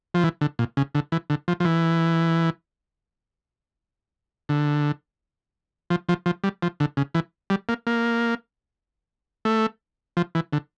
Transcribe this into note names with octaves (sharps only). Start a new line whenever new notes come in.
F3
E3
D3
A#2
C#3
D3
E3
D3
F3
F3
E3
D3
F3
F3
F3
G3
F3
D3
C#3
E3
G3
A#3
A#3
A3
F3
E3
D3